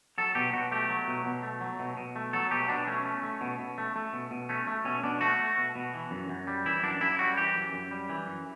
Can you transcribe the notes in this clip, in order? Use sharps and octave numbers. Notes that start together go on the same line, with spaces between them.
F#3 A4
B2 G4
B2 F#4
A3 G4
F#3
B2
B2
A3
F#3
B2
B2
A3
F#3 A4
B2 G4
B2 D4
A3 C#4
A3
A3
B2
B2
A3
A3
B2
B2
A3 C#4
A3
B2 C#4
B2 D4
A3 F#4
A3
B2
B2
E3
F#2
F#2
G3
E3 E4
F#2 D4
F#2 E4
G3 F#4
E3 G4
F#2
F#2
G3
E3
F#2